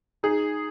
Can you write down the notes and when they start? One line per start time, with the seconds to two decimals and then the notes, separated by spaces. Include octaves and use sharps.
0.23 D#4 G#4